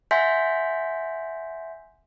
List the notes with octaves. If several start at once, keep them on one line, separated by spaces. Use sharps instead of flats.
E5 F#5 G#5 C6 G6 B6